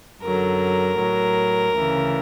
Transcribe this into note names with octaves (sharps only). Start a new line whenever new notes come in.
F#2 D3 F#3 A#4
A2 F#3
D2 C#3 E3